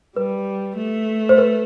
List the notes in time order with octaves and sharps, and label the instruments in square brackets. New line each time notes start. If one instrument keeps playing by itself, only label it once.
[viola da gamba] G3 [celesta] B4
[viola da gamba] A3
[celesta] C5
B4